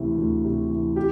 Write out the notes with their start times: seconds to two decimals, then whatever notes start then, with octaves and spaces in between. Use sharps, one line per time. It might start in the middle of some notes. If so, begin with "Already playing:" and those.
Already playing: D2 C3 E3
0.17 D2
0.44 C3
0.70 E3
0.96 G4